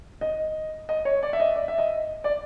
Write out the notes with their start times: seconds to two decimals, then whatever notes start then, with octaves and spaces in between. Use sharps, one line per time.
0.21 D#5
0.89 D#5
1.05 C#5
1.23 D5
1.33 E5
1.40 D#5
1.56 D5
1.68 E5
1.78 D#5
2.24 D5